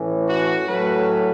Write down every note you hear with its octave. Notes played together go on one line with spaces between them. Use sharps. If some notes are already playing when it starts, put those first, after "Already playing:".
Already playing: A2 E3 C#4
F#4
A2 F#3 A3 C#4 B4